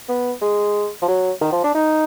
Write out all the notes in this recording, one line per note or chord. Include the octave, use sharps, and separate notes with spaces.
B3
G#3
F3
F#3
D#3
F3
D4
D#4